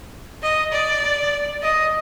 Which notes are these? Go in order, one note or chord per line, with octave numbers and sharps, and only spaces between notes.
D#5
D5
D#5